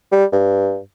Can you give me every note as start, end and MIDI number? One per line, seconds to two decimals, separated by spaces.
0.12 0.25 55
0.33 0.79 43